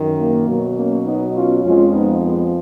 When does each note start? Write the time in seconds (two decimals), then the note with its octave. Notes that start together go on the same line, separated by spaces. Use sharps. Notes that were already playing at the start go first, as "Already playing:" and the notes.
Already playing: F#2 D#3
0.17 A#3
0.47 B2 F#3
0.76 A#3 C#4
1.05 B3 D#4
1.35 C#4 F4
1.63 F2 F3 G#3 C#4 F4
1.92 B3 D#4
2.21 G#3 B3